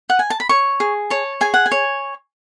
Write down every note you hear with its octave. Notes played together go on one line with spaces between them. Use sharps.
F#5
G#5
A5
B5
C#5 C#6
G#4
C#5 A5
G#4 G#5
F#5
G#5
C#5